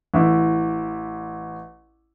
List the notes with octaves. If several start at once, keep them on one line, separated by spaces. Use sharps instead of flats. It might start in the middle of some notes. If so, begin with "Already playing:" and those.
A1 E4